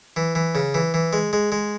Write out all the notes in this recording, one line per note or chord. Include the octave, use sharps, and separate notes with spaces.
E3
E3
C#3
E3
E3
G#3
G#3
G#3